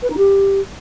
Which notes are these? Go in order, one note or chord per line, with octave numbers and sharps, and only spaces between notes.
B4
D#4
G4